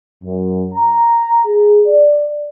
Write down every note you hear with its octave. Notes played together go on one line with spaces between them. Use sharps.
F#2
A#5
G#4
D5